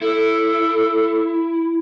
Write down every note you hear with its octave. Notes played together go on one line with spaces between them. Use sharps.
E4 A4